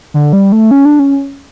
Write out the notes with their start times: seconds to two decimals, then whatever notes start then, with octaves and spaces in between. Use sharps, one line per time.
0.14 D3
0.33 G3
0.52 A3
0.71 C#4
0.85 D4
0.99 C#4